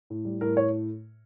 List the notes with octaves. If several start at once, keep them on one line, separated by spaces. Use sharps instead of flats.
A2
G3
A2 A#4
A2 C#5